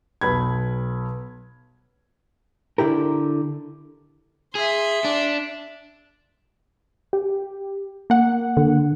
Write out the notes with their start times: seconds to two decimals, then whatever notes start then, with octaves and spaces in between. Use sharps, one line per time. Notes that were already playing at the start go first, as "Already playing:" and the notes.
0.21 B1 B4 B5 G#6
2.78 D3 E4 G4 A#4
4.55 G#4 E5 C6
5.05 D4
7.13 G4
8.10 A#3 F#5
8.57 D3